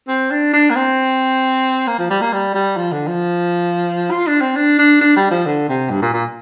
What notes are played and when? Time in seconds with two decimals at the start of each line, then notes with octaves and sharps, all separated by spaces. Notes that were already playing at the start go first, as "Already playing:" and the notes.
0.08 C4
0.31 D4
0.53 D4
0.70 A#3
0.75 C4
1.87 A#3
1.98 F3
2.10 G3
2.21 A#3
2.32 G3
2.54 G3
2.77 F3
2.92 D3
3.07 F3
4.11 F4
4.27 D4
4.41 C4
4.56 D4
4.79 D4
5.01 D4
5.16 G3
5.31 F3
5.46 D3
5.69 C3
5.90 G2
6.02 A#2
6.13 A#2